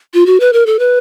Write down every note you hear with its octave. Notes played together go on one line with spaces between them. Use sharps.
F4
F#4
B4
A#4
A4
B4